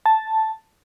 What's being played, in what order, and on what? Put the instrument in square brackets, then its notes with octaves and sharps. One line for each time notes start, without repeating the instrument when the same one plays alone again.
[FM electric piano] A5